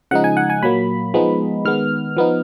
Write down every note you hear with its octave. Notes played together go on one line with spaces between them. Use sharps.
C#3 F3 G#3 D#4 F#5
G#5
F#5
G#5
A#2 F#3 A#3 B5
F3 G#3 B3 D#4
D#3 G#3 B3 F6
F3 B3 D#4